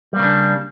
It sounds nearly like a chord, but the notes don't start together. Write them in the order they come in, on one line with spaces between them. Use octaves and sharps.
G3 A#3 C#3 D4